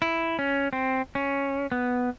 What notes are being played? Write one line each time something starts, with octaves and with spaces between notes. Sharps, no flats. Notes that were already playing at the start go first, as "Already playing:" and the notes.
E4
C#4
C4
C#4
B3